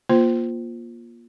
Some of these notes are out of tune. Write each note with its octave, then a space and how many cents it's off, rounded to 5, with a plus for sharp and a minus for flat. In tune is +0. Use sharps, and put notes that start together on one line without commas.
A#3 +25 F4 +0 C5 -15